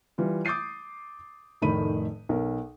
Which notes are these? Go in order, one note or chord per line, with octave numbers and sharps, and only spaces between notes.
E3 G3 F4
D6 D#6 G6 A6 C7 D#7
F1 A2 D#3 B5 D#7
B1 A#4